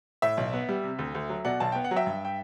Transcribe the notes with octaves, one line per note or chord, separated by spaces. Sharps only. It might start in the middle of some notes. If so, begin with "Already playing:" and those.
A2 E5
B1
B3
G3
C3
D2
D2
F#3
B2 D5 F#5
B1 A5
B3 G5
F#5
F#3
E5 G5
G2
G5